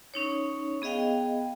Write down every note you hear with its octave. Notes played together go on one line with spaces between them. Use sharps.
C#4 D#4 C#5
B3 G#4 D#5 F5 G5